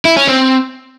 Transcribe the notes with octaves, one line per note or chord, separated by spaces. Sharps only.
E4
C#4
C4